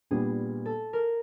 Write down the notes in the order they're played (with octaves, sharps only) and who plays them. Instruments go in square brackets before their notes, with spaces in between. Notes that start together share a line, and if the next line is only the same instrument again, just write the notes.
[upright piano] A#2 G3 B3 D4 [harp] G#4
[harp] A4
A#4